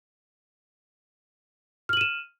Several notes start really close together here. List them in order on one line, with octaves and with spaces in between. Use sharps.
F6 F#7 D#7 E7